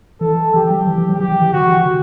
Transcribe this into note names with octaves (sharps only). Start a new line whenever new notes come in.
E3 A4
E3 G4
F#3
E3
E3
F#3
E3 G4
E3
E3
D3 F#4
E3
D3